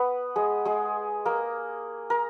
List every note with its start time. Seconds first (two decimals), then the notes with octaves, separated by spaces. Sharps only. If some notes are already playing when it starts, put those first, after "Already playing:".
Already playing: B3 B4
0.36 G#3 G#4
0.65 G#3 G#4
1.26 A#3 A#4
2.10 A#4